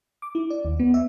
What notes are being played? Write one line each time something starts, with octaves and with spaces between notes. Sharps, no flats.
D6
E4
D5
D#2
B3
E5